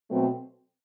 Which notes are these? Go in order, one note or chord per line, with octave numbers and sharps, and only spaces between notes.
B2 F#3 A3 C4